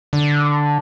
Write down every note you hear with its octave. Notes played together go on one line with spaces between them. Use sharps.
D3